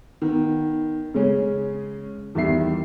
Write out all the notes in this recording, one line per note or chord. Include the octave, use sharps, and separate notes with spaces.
D#3 B3
C#3 G#3 C#4
E2 D#3 G3 E5 C7